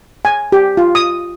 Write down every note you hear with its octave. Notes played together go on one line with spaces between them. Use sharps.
G#5
G4
F4
D#6